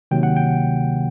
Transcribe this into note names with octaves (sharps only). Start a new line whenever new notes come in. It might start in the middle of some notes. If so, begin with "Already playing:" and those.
C3 D#3 F#3 A#3 G5
F#5
G5